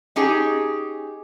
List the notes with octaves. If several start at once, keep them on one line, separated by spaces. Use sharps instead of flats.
C#4 D#4 G4 G#4